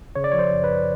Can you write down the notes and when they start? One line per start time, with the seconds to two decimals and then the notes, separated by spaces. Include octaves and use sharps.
0.15 C#3 C#5
0.24 D5
0.31 F3 C#5
0.39 C5
0.51 F#2
0.64 B4
0.69 F#2